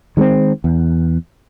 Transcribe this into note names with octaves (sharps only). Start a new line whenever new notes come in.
D#3 G#3 B3 C4
E2